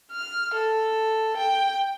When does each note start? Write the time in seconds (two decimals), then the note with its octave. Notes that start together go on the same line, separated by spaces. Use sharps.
0.12 F6
0.54 A4
1.37 G5